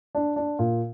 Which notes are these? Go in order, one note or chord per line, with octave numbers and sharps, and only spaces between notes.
D4
D4
A#2